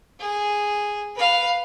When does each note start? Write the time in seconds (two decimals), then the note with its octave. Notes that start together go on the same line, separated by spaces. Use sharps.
0.20 G#4
1.16 B4 F5